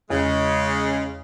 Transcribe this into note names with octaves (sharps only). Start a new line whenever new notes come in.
E2 C#3 G#3